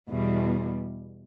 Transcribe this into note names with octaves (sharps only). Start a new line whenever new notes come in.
E2 B2 G3